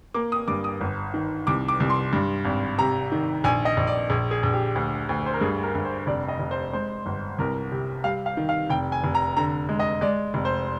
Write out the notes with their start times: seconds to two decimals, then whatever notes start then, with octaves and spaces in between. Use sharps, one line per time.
0.14 A#3 D6
0.32 D#6
0.48 G2 D6
0.64 D#6
0.81 G1
1.14 D#3
1.47 C2 D6
1.68 D6
1.80 C2
1.90 C6
2.13 G2
2.45 G#1
2.78 C3 A#5
3.12 D#3
3.44 A#1 G#5
3.65 D#5
3.77 A#1
3.87 D5
4.10 A#1 G#4
4.31 G#4
4.43 A#1
4.53 G4
4.75 D2
5.09 D2
5.26 C5
5.34 A#4
5.41 G2 G#4
5.63 A#4
5.75 G2
5.85 C5
6.07 F1 D5
6.28 D#5
6.39 F1
6.51 C5
6.73 G#3 C5
7.06 G1
7.38 C2 A#4
7.72 C3
8.04 G3 F5
8.26 F5
8.37 D#3
8.49 F5
8.70 F1 G5
8.92 G#5
9.04 F1
9.15 A#5
9.37 D3 A#5
9.69 G#3
9.79 D#5
10.01 G#3 D5
10.34 F1
10.45 C5